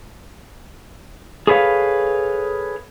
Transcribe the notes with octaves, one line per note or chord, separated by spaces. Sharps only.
G#4 A4 B4 C#5 F5